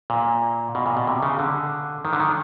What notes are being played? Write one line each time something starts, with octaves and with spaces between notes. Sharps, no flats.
A#2
B2
A#2
B2
C3
C#3
D3
D#3
D3
D#3